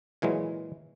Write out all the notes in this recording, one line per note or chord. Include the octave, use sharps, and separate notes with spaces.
A#2 E3 F#3 G#3